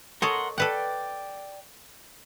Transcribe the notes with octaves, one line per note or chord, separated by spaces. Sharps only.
A4 A#4 C#5 D#5 F#5 C6
A4 B4 D5 F#5 G5